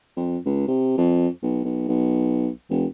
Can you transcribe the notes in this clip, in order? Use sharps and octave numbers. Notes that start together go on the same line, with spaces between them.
F2
C#2
C3
F2
B1
B1
B1
F1